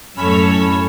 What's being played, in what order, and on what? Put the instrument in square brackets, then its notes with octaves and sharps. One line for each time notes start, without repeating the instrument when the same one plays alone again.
[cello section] F#2 A2 [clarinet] C#4 [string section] A4 C#5 E6 [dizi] B5